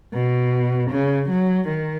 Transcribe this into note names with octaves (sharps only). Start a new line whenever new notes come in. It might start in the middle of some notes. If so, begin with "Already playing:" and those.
B2
C#3
F#3
D#3